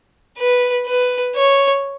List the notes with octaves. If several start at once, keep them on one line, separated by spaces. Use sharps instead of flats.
B4
B4
C#5